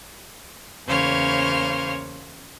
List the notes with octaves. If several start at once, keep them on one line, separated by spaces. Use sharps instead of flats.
E2 C#3 A#3 C5 C#5 F6